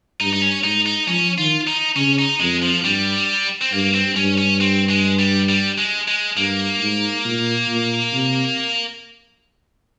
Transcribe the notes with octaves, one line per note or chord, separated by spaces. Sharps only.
G2 D#4
D#4
C#4
G#2 D#4
D#4
F3 C#4
D#3 F4
D#4
C#3 C#4
D#4
F2 G#3
F3
G2 G3
C4
G2 A#3
C4
G2 C#4
C#4
C4
G#3
G3
G3
G#3
G#3
G2 A#3
G#2
A#2
A#2
C3